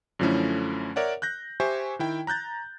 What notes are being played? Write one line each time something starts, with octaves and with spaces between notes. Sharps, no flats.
F#2 D3 F3 A3 C#4 E4
A#4 C#5 D5 E5 F#5
F#6 G6 A#6
G4 C5 E5 G#5 C#6
D#3 E4 G5
A#5 F#6 G6 A6